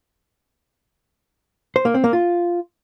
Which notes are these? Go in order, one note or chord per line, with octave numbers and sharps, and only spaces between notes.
C5
A#3
C4
A#3
F4